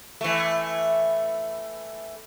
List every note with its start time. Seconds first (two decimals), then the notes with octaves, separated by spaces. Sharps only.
0.21 E3 A3